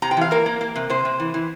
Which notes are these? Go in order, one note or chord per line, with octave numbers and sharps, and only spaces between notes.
C3 A#5
G5
E3 F5
A#3 A#4
A#3
A#3
C3
C3 C5
C3
E3
E3